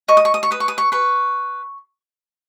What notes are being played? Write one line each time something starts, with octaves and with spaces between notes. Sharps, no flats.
D#5 C#6
D#6
C#6
D#6
C#6
B4 D#6
C#6
D#6
C#6
B4 C#6